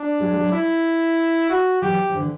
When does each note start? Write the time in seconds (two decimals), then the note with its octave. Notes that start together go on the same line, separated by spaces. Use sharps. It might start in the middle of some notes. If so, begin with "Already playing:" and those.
Already playing: D4
0.19 F#3 G#3
0.36 F#3 G#3
0.52 E4
1.50 F#4
1.82 E3 F#3 G4
2.09 F3
2.15 D3 E3